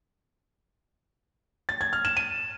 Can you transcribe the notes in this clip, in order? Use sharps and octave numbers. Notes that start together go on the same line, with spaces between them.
A6
G#6
F6
E7
D#7